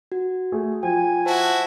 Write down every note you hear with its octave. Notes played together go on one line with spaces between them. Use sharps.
F#4
A3 G#4
F3 G5 G#5
E4 F#4 C5 A5